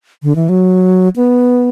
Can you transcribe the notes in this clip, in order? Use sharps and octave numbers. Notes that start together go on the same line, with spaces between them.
D3
E3
F#3
B3